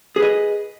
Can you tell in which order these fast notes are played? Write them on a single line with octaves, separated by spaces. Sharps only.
G#4 B4 D#5